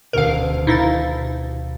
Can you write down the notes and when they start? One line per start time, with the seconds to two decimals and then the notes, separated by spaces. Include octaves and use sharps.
0.13 D#1 D2 B2 A#4 F5
0.67 B2 D#4 E4 F5 E6 A6